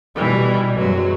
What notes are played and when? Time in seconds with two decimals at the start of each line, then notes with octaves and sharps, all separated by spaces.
0.16 B2 E3 G3
0.77 F#2 E3 F#3 G#3